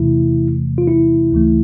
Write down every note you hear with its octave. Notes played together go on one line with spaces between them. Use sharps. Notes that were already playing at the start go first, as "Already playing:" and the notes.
Already playing: E2 C3 E3 A3 E4
F4
E4
D2 C#3 E3 A3